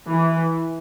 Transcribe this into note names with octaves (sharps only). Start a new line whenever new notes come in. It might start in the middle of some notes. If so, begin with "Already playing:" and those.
E3